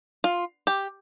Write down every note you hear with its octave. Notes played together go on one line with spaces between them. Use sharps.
F4
G4